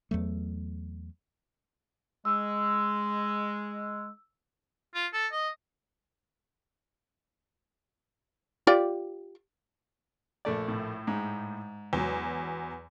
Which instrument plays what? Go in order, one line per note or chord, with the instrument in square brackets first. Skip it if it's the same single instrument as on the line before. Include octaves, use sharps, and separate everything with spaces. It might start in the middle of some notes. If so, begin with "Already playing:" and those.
[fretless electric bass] E2 F#3 A3
[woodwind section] G#3 [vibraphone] E6
[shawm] F4
A4
D#5
[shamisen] F4 G4 D5
[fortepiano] A#1 A3 D5
[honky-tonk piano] A2
[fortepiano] G#2
[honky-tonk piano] E2 F#3